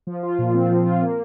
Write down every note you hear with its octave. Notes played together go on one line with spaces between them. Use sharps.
F3
F4
A#2
C4
F3
F4
A#3